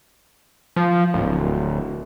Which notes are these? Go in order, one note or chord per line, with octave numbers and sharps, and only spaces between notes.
F3
D1